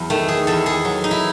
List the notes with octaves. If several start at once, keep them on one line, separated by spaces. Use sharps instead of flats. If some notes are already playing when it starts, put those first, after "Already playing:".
Already playing: E2 F#3 B3
D#3 A3
G#4
E2 A4
G#4
F#3
D#4
E4